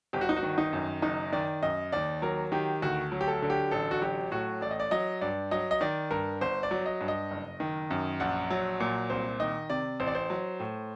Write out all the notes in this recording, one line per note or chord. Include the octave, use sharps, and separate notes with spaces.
G1 G4
F#4
D#4
F#4
D#3
D#4
F#2
F#1 D#4
D#3 D5
F#2 D#5
D#2 D5
F#3 A#4
D#3 G4
D2 F#4
F#3
G4
A4
D3
G4
A1 A4
F#4
F#3 G4
A2 F#4
A1 D5
D#5
D5
F#3 D#5
G2 D5
F#3 D#5
D#5
D#3 D5
G2 A#4
G1 C5
D5
F#3
D#5
G2
D#5
F#1
D#3
F#2
A#1 F#5
F#3
A#2
C2 C5
D#3 D#5
C3 D5
A1 C5
D5
C5
F#3
A2